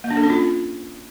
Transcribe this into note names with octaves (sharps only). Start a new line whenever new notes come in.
A#3
D4
A4
C#4
F4